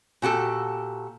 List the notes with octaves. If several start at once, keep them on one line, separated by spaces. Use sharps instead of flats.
A#2 F#4 G4 A4